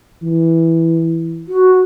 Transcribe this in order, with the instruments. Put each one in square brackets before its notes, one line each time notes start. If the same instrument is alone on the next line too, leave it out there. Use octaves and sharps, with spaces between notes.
[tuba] E3
[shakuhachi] F#4